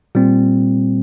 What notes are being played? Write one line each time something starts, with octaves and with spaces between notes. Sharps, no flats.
A#2 G3 C4